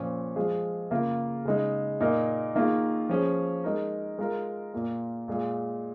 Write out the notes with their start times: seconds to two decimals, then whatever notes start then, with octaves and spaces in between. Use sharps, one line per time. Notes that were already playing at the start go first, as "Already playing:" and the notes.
Already playing: A#2 F3 C#4
0.36 F3 G#3 F4 G#4
0.91 C#3 A#3 F4 A#4
1.45 C#3 G#3 D#4
2.00 A#2 A#3 D#4 A#4
2.55 D#3 A#3 F4 G#4
3.09 F3 C#4 G#4
3.64 G#3 D#4 A#4
4.18 G#3 F4 A#4
4.73 A#2 A#3 F4 A#4
5.28 A#2 G#3 F4 G#4